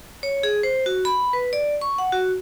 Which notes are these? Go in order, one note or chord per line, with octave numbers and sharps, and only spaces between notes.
C#5
G#4
C5
F#4
B5
B4
D5
C#6
F#5
F#4